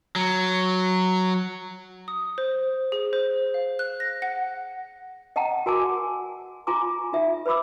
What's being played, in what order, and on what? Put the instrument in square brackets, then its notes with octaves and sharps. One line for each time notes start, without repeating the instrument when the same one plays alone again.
[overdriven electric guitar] F#3
[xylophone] D#6
C5
G#4
C5
F5
F#6
A#6
F#5
[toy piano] D#5 F#5 G5 A5 A#5
F#4 A#4 G#5 A5 D6
F4 G#5 A#5 C6 D6
D#4 F4 E5
B4 C5 B5 D6 E6